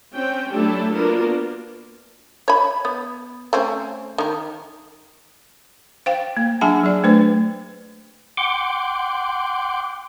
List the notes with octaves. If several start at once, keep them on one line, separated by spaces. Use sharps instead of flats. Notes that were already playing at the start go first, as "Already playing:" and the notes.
C4 C#4 G5
F#3 A3 D4 E4 G4 A4
A#3 B3 D4 F4 F#4 A#4
C#5 B5
B3
A3 C4 C#4
D#3 A#4
C5 F5 G5
A#3
F#3 D4 G#4 F#5 G#5 A5
F#3 G#4 D5
A3 D4 B4 C5
F#5 G5 C6 D6